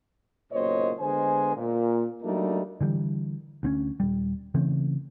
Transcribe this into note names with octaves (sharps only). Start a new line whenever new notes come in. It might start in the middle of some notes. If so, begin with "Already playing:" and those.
F#1 B1 A#2 C5 C#5 D#5
D3 G#3 B3 C5 G#5
A#2
F#3 G3 A3 A#3 D4 D#4
D3 E3 G3
D2 C4 C#4
D#1 G3
C#3 E3 A3 C4